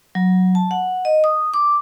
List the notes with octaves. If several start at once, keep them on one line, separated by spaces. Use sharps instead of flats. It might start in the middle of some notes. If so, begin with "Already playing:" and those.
F#3
A5
F#5
D#5
D#6
D6